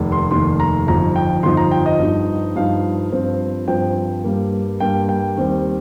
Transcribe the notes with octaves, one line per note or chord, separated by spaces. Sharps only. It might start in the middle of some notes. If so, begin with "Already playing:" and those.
Already playing: F1 D#2 D#3
C6
F1 D#2 D#3 C6
A#5
G1 F2 F3 D#4 A#5
G5
G1 F2 F3 D#4 C6
A#5
G5
D#5
G2 F3 D#4
G2 F3 D#4 F5
G2 F3 C4
G2 F3 C4 G5
G2 G3 A#3
G2 G3 A#3 G5
G5
D#2 D#3 G3 C4